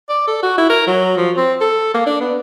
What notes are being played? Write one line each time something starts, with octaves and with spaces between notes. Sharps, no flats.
D5
A4
F#4
E4
A#4
F#3
F3
C4
A4
A#3
D4
B3